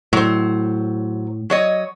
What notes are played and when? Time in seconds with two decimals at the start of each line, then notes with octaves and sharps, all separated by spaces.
0.13 A2 F#3 C5
1.50 F#3 C#5 D#5